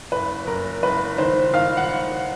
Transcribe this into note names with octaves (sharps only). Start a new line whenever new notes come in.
F#1 B4
F#1 A#4
F#1 B4
D#3 C5
D#3 F5
F#5